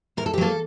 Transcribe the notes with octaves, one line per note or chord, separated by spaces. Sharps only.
A2 A#4
A4
G4
F#3 A#3 A4